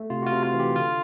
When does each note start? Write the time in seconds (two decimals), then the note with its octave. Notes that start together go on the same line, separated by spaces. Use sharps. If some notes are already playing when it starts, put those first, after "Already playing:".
Already playing: A3
0.10 C3 F4
0.22 F#4
0.26 F4
0.32 C3
0.43 F4
0.54 E3
0.59 G4
0.76 D3 F4